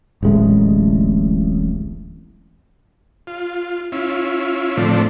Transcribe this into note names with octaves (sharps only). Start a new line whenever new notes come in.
D1 A1 G#3 A3
F4
C#4 E4 F4
A2 D3 F3 A3 C4 D4